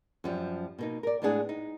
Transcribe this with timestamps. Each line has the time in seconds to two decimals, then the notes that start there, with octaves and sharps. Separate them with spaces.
0.24 F#2 F3 G3
0.79 B2 A#3 D#4
1.03 A#4 D5
1.22 A2 G#3 B3 D4 G#4
1.49 D#4